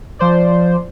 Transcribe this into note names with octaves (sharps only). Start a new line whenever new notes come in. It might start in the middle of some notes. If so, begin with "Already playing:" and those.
F3 C5 D5